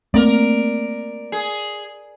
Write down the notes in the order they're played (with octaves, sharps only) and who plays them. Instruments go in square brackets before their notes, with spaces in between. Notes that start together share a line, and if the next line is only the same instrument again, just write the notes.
[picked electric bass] A3 A#3 C4 [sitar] A#4 D5
[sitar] G#4